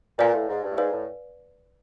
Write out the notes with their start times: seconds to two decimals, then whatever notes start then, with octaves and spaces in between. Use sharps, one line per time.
0.19 A#2 B4 D5 F5 G#5
0.34 A2
0.48 G#2
0.63 G2
0.71 A2
0.77 G#2 B4 D5 F5 G#5
0.92 A2